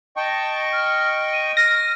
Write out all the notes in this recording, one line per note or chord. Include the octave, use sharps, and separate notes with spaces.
D#5 G5 A5 C#6
F6
D#7
F6 A#6